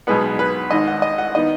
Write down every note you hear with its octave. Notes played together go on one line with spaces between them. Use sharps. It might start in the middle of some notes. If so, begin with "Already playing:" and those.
B1 B2 G#3 B3 B4
B4
G#1 G#2 D#3 D#5
F#5
D#5
F#5
D#3 B3 D#4 D#5